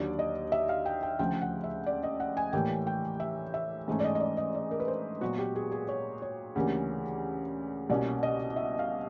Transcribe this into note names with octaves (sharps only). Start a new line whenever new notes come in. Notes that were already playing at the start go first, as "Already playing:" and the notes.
Already playing: D#2 D3 F#3 D5
D#5
E5
F5
G5
G5
D2 C#3 F3 G5
F#5
E5
D5
D#5
F#5
G#5
A2 E3 G3 A#3 G5
G5
E5
E5
G#2 E3 A3 C#4
D5
D#5
D#5
D5
D#5
D5
A#4
B4
C5
A#2 F#3 B3 F#4
G4
G#4
G#4
C#5
C#5
D2 C#3 E3 G3 A#3
C2 B2 G3 A#3 C#4 D5
D#5
E5
F5